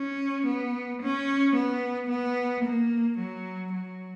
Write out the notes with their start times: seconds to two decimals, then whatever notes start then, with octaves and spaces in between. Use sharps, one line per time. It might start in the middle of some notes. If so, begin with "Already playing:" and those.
Already playing: C#4
0.46 B3
1.01 C#4
1.55 B3
2.09 B3
2.64 A#3
3.18 F#3
3.72 F#3